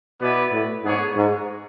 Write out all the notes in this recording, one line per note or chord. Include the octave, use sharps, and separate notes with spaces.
B2 B3 E4 B4 D5
A2
G#2 B3 D4 G#4 C#5
G#2